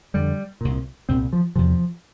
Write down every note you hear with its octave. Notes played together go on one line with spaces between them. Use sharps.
F2 D3 G3
C2 A#2
C2 A#2 C4
F3
E2 C3 F3